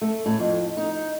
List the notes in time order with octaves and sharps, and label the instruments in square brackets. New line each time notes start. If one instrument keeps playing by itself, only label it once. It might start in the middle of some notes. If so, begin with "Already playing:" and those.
[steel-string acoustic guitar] A3
A2
F2
D#4